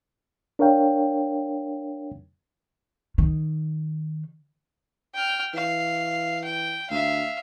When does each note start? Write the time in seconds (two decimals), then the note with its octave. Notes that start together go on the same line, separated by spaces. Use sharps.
0.59 D4 A#4 C#5 F5 G5
3.18 D#3
5.15 G5 F6
5.54 E3 F5
6.45 G5
6.90 D2 E5 F5